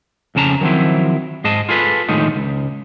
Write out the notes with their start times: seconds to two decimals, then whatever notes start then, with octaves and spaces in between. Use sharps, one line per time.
0.35 F2 C#3 C#4 A5 A#5
0.61 D#3 F3 F#3 C4 E4
1.44 G#2 G#4 D#5 A5
1.69 F4 G#4 A4 B4
2.08 A2 D3 D#3 F3 G#3 D#4
2.36 C#2